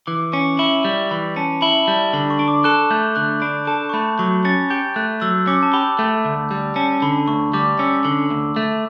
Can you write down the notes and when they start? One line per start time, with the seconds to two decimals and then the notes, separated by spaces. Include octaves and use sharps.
0.07 E3 D6
0.33 C#4 C#6
0.59 E4
0.85 G3
1.11 E3 B5
1.36 C#4 A5
1.62 E4 B5
1.87 G3 A5
2.13 D3 B5
2.30 C#6
2.39 D4
2.48 D6
2.64 A4 F#6
2.91 A3 G6
3.16 D3 F#6
3.42 D4 B5
3.67 A4 A5
3.89 C#6
3.93 A3 B5
4.19 F#3 C#6
4.45 C#4 A6
4.70 G4 G6
4.96 A3 F#6
5.21 F#3 E6
5.47 C#4 D6
5.63 A5
5.73 G4 B5
5.99 A3
6.25 D2
6.51 G3
6.76 C#4 A5
7.02 D3 B5
7.27 D2 C#6
7.53 G3 D6
7.79 C#4 E6
8.05 D3
8.30 D2
8.56 A3